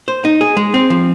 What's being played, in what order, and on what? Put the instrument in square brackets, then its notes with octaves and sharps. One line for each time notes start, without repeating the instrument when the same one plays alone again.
[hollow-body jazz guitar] C5
D#4
G#4
G#3
C4
F3